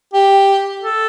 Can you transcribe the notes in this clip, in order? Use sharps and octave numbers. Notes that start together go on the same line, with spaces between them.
G4
A4